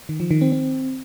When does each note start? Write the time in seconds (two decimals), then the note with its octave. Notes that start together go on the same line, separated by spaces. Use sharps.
0.09 D#3
0.20 F3
0.31 D#3
0.41 C4
0.52 C4